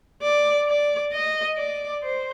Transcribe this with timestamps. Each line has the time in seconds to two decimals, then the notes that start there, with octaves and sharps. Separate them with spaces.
0.22 D5
0.67 D5
1.13 D#5
1.57 D5
2.03 C5